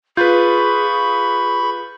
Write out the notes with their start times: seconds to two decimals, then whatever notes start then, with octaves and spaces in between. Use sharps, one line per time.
0.17 F4 G#4 B4 B5 C#6 G6